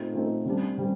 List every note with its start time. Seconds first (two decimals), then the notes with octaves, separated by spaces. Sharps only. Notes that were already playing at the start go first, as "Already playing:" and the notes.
Already playing: A#2 A3 C4 D#4
0.14 A#2 A3 C4 D#4
0.45 C3 G3 D4
0.78 C3 G3